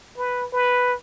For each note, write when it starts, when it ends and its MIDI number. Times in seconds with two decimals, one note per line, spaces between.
0.17 0.46 71
0.53 0.95 71